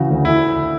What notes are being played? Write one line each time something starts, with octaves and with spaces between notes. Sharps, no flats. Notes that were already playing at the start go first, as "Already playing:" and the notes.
Already playing: C#3 E3 F#4
D2
E4